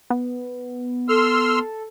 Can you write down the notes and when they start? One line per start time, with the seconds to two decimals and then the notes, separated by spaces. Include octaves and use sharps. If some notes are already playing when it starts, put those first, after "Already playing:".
0.10 B3
1.09 A4 C6 E6 F6